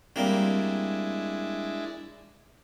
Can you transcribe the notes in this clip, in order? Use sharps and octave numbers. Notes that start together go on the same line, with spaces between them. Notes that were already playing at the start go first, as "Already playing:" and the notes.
G3 G#3 A#3 C4 D4 E4